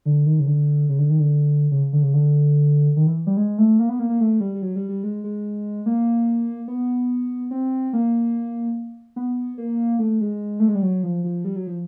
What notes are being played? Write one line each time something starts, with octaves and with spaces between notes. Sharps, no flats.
D3
D#3
C#3
D3
C#3
D3
D#3
D3
C#3
D3
C#3
D3
D#3
E3
G3
G#3
A3
A#3
B3
A#3
A#3
A3
G3
G3
F#3
G3
G3
G#3
G#3
A#3
B3
C4
A#3
B3
A#3
A3
G#3
A3
G#3
G3
F#3
F3
F3
G3
F#3
F3